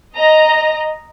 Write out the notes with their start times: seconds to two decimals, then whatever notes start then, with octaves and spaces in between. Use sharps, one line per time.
0.15 D#5 A#5